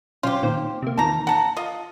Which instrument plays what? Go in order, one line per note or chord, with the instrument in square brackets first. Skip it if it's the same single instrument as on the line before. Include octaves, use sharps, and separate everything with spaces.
[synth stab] B1 C#4 C5 [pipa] F4 G4
[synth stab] A#2 D#3 C4
C3 A#3
[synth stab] E2 A#2 D#3 [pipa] A5 A#5
[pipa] F#5 A5 A#5
F4 D#5